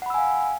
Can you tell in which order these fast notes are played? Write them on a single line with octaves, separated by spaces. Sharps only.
F#5 B5 E6 G#5 F5